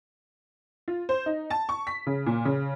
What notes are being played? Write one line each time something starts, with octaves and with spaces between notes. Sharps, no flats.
F4
C5
D#4
A5
C#6
B6
C#3
A#2
C#3